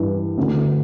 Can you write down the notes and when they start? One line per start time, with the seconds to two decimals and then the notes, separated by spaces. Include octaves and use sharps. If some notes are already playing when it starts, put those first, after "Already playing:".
Already playing: G2 E3
0.38 D2 D3